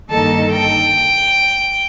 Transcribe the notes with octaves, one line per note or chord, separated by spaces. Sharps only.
G2 D#3 A#3 D#4 A4 A5
G5